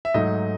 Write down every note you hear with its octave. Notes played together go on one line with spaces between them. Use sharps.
E5
G#2 F#3 A3 D#4 D#5